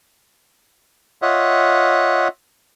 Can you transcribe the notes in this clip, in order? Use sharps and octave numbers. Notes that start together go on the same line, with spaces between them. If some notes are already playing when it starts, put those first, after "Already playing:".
F4 C#5 D#5 E5 F#5